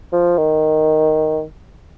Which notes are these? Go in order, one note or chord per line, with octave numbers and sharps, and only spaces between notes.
F3
D#3